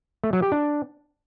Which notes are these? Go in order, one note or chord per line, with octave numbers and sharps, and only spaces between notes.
A3
F#3
G4
D4